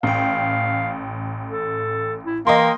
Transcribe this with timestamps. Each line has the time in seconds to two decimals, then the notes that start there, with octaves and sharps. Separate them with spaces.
0.03 A1 F5 G5
1.50 A4
2.24 E4
2.47 E3 A#3 D#5 G5 C6